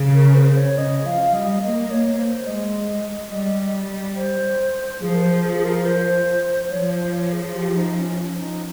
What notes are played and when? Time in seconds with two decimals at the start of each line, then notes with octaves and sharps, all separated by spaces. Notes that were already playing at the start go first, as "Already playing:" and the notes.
Already playing: C#3
0.14 A#4
0.35 C5
0.56 C#5
0.77 C#3 D#5
1.05 F3 F5
1.34 G3 D#5
1.62 A#3 D#5
1.91 C#5
2.18 C5
2.47 G#3 D#5
3.31 G3
4.16 C5
5.01 F3 G#4
5.14 A#4
5.22 C5
5.43 G#4
5.57 G#4
5.65 A#4
5.86 C5
6.69 F3 C#5
6.91 C5
7.12 C#5
7.33 G#4
7.55 G4
7.75 D#4
7.97 C#4
8.18 C#4
8.39 D#4